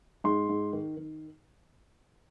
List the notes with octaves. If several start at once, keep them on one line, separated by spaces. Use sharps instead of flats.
G#2 C6
G#2
D#3
D#3